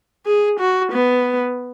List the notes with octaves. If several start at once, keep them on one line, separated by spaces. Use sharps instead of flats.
G#4
F#4
B3